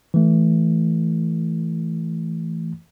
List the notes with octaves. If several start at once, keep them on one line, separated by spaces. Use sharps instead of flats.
E3 A3